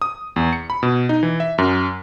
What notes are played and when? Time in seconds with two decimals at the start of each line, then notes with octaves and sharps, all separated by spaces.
0.02 D#6
0.36 E2
0.53 C#7
0.70 B5
0.83 B2
1.09 D#4
1.23 E3
1.40 E5
1.58 F#2